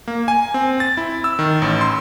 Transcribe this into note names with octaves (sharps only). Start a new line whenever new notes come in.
A#3
G#5
C4
A6
E4
E6
D#3
A1
C6